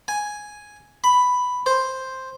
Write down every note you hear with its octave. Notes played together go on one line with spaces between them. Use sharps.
G#5
B5
C5